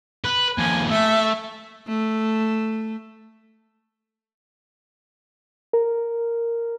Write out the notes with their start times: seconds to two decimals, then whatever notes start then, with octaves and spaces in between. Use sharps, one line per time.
0.24 B4
0.58 D#2 F3 G#5
0.90 A3 E5
1.88 A3
5.73 A#4